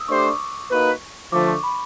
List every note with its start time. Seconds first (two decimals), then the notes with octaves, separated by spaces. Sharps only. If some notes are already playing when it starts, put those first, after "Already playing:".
Already playing: D#6 E6
0.08 A3 D4 G4 C5 C#6
0.18 D6
0.26 C#6
0.70 A#3 D#4 F#4 B4
1.32 D3 F3 A3 D6
1.47 C#6
1.63 B5